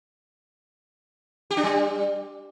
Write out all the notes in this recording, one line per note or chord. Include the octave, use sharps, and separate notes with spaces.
G4
D4
G3